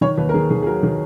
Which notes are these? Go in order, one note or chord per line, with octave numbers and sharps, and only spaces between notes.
D#3 C#5
D#2 B4
A#4
D#3 G#4
D#3 G#4
G#4
F#3 A#4
D#3 G#4